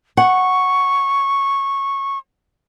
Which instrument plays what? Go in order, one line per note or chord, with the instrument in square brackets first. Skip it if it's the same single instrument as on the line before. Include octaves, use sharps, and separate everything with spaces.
[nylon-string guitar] F#5 [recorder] C#6